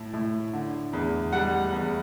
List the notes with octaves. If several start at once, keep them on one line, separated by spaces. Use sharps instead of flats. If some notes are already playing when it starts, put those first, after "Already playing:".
Already playing: A2
A2
D3
E2
G3 F#5
E2